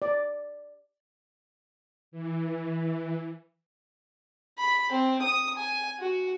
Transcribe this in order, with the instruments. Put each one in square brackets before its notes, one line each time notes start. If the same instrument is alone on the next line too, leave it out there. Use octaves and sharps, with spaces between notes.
[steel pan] D5
[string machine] E3
[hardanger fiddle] B5
C4
D#6
G#5
F#4